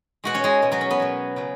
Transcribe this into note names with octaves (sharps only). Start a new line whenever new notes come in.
B2 G#3 F#4 F#5
C#4 C#5
G#3 G#4
B2 G#3
F#3 F#4
C#4
B3
B2 F#3
C#3 F#3